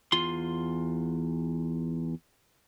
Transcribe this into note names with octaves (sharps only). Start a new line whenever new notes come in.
E2 F4 C6